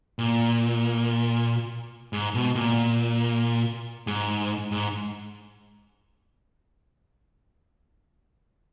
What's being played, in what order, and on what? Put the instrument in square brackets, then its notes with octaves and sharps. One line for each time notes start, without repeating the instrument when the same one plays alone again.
[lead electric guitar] A#2
G#2
B2
A#2
G#2
G#2